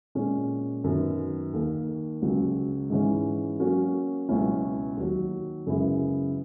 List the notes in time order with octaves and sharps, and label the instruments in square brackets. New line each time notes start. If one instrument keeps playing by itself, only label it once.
[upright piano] A#2 G#3 C#4
F#2 D#3 F#3 B3
D#2 D#3 A#3
C#2 C#3 F#3
G#2 E3 G#3 C#4 E4
F#3 A#3 C#4 F#4
C#2 B2 F#3 C#4 E4
D#2 D#3 F#3
F#2 C#3 G#3 B3 E4